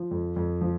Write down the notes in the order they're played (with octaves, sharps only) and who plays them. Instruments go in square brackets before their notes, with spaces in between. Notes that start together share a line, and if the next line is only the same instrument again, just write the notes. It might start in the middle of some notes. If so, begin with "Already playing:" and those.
Already playing: [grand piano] F3
F2
F2
F3